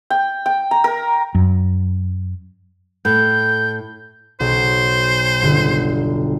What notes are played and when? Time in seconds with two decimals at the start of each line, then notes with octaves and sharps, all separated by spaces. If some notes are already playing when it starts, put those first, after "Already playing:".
0.10 G5
0.46 G5
0.71 A#5
0.84 A#4
1.35 F#2
3.05 A2 G6
4.40 B1 C5
5.42 G1 D3